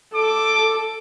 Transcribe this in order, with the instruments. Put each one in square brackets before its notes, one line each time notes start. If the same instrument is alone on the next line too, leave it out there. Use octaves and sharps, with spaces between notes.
[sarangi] A4 [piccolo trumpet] D6